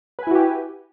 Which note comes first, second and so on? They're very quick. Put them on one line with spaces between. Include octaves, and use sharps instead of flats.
B4 G#5 E4 F#4 G4